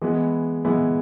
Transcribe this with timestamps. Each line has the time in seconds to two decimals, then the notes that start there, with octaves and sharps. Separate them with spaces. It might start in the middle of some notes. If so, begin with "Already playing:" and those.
0.02 E3 G#3 B3 E4
0.65 E3 G#3 B3 E4